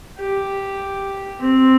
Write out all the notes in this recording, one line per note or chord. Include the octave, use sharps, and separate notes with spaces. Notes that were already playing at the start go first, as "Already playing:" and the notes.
G4
C4